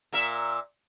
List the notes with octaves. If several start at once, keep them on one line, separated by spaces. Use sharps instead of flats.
A#2 A#4 E5